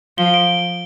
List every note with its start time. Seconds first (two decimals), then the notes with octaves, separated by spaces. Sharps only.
0.18 F3 G7
0.34 D7